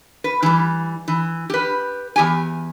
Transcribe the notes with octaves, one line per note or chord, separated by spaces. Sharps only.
B4
E3 G3
E3
G4 B4
E2 G4 G#5